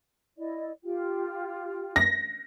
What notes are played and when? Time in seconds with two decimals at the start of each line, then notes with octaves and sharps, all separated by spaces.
0.38 E4 D5 D#5
0.84 F4 G4 G5
1.96 A#6